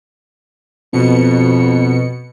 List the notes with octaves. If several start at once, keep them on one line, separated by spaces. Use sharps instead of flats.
F2 B2 C#7